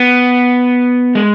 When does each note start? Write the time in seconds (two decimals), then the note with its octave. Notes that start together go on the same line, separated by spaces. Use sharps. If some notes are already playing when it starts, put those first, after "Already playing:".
Already playing: B3
1.15 G#3